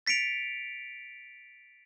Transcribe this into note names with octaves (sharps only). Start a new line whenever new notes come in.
A6 B6 C#7 D7 F7